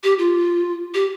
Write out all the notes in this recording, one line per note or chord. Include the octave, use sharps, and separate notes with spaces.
G4
F4
G4